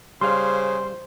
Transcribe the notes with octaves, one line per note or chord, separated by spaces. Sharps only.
C#3 G3 C5 F5 C6